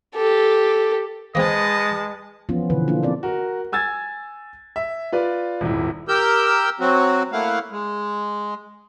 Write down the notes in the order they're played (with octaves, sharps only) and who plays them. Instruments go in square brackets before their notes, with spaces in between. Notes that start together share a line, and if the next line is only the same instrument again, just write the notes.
[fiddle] G4 A4
[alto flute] G#3 [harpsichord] A#3 C4 [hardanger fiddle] B4 A5 [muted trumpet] D#5
[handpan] E3 F3 B3 C#4 F4
B2 D3 E3 B4
A#3 D4 F4
B3 C4 D5
[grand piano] F#4 A#4
G#5 E6 G#6 A6
E5
F4 B4 D5
D#1 G#1 E4
[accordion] G4 A#4 E6 G6
F#3 C4 F#4
A3 A#3 E4 F5 F#5
G#3